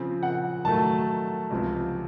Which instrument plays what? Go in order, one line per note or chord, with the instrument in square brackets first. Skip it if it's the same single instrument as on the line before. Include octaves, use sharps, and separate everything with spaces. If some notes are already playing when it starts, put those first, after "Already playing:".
Already playing: [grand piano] C#3 F3 C4
[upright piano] F#5
[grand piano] D#3 F#3 A3 [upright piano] A5
[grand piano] C#2 C3 F3 C4 F4